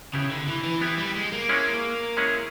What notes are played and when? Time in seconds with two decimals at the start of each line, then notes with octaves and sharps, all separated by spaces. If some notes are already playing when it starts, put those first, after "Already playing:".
0.14 C#3 B3 E4 G4
0.31 D3
0.48 E3
0.64 E3
0.81 E3 B3 E4 G4
0.98 G3
1.16 G#3
1.33 A#3
1.49 G#3 C#4 E4 G#4
2.17 G#3 C#4 E4 G#4